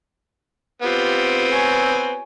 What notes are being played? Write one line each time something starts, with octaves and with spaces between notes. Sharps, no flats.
B3 C4 F4 G4
C#5 G#5